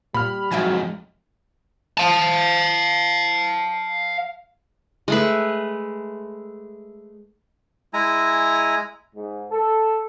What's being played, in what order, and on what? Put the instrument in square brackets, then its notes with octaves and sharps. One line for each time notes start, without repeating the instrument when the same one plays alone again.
[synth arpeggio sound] A#2 [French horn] G3 [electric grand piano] B5 F6
[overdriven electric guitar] F2 G#2 [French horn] F#3 [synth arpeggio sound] E5 G5 G#5
[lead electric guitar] F5 A5
[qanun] G#3 A3 B4
[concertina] G#3 E4 G#5 A#5
[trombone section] G#2
A4